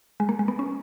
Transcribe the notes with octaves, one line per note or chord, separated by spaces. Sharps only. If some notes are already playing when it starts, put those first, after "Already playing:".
G#3
A#3
G#3
B3
C#4